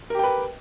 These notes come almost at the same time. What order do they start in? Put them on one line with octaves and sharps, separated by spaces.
A#4 G4 G5 B4